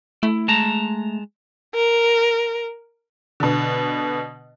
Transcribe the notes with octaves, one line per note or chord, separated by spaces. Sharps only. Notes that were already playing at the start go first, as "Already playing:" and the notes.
A3 E4
G#3 A5 A#5
A#4
B2 D3